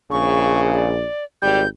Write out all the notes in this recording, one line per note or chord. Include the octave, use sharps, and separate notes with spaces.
A#1 C#3 C#6
D5
G#1 G3 G6